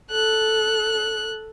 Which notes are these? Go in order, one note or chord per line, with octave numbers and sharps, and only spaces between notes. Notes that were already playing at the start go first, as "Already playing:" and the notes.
A4 F#6